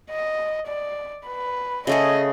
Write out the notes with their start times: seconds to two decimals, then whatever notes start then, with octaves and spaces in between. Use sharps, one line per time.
0.11 D#5
0.67 D5
1.27 B4
1.87 C#3 A3 G#4 D#5